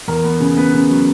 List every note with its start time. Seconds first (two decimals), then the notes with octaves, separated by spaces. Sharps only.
0.08 E2 A#4
0.24 B3
0.40 C#3
0.57 B3 B4
0.74 C#3
0.90 F#3